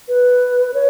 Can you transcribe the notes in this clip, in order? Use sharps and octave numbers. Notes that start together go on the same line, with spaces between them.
B4
C#5